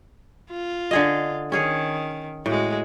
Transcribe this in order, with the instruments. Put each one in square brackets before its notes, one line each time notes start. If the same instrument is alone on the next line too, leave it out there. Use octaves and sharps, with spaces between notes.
[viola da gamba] F4
[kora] D3 G#4 D#5
[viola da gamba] D#3 [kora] C#4 G#4 C#5
[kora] A2 [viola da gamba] G#3 F#4